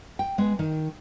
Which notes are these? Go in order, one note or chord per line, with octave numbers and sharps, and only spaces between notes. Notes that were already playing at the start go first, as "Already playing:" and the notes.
G5
G#3 B3
D#3